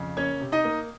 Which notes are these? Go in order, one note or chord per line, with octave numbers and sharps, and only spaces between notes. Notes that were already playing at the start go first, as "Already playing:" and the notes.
Already playing: F2 C#3
A#3 C#4 C#5
C3
D#4 D#5
A#3